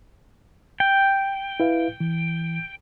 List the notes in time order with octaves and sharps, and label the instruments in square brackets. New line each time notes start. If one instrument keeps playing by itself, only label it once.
[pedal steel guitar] G5
[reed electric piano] E4 B4 F5
E3